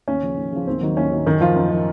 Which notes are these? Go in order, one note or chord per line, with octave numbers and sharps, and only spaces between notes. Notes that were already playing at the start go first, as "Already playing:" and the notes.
D#2 C#4
C#3 F3
D#2
C#3 F3
D#2 C4
D#3 F#3
D#2 C#4
D#3 F#3
F#2 D#3 D#4
F3 F4
F#2
F3